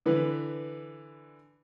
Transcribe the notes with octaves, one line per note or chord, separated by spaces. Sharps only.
D3 E3 B4